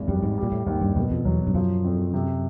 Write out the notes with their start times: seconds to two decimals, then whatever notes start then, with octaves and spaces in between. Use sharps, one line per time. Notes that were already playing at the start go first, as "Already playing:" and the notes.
Already playing: G#1 E2
0.08 F#2 G3
0.23 G#2
0.38 G3
0.43 A#2
0.52 A2
0.66 D#2 G#2
0.81 G2
0.96 F#2 B2
1.11 F2
1.25 E2 F#3
1.47 G2
1.54 F#2 F3
1.84 F2
2.13 C3